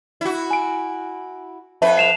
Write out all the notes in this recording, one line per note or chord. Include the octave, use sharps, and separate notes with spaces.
E4 F#4
G#5 D7
F2 B4 E5 A5
C7 E7 F7